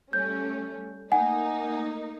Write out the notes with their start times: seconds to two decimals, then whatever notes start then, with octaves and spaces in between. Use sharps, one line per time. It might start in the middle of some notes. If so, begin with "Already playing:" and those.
0.13 G3 A3 C#4 G6
1.12 A3 A#3 D#4 F#5 G#5